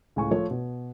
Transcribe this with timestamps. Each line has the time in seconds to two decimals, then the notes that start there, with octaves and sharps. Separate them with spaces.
0.16 C#2 A2 G#5 C#6
0.31 F3 A3 C#5
0.51 B2